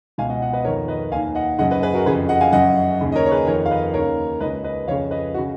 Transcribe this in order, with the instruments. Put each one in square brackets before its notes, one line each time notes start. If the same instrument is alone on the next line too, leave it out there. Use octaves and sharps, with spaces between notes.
[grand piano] C#2 B2 F5 G#5
D#5 F#5
D#5 F#5
B4 D#5
F2 D#3 A#4 C#5
B4 D#5
D#2 D#3 F5 G#5
D#5 F#5
F#2 C#3 D#5 F#5
B4 D#5
G#4 B4
F#4 A#4
C#3 G#4 B4
F2
D#5 F#5
F5 G#5
F#2 C#3 D#5 F#5
D#2 C#3
D#5
A#4 C#5
C#5
G#4 B4
F2 D#3 A#4 C#5
F5
B4 D#5
D#2 C#3 A#4 C#5
C#2 B4 D#5
C#3
B4 D#5
F2 C#3 C#5 F5
B4 D#5
F#4
C#3